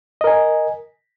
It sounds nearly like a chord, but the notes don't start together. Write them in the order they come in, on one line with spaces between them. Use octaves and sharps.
D#5 A#4 G#5